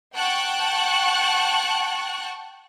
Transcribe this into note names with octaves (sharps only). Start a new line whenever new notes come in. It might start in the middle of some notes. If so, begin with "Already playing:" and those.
F#5 G5 A5 C#6 F#6